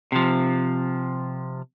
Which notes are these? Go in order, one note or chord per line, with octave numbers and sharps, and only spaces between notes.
C3 F3